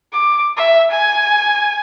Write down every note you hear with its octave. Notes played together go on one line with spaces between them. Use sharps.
D6
E5
G#5